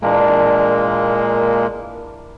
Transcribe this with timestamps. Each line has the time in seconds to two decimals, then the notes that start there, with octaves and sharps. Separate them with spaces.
0.02 A#2 E3 G#3 A#3 D4 A#4